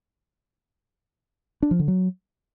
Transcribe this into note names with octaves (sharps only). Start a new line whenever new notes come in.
D4
F3
D3
F#3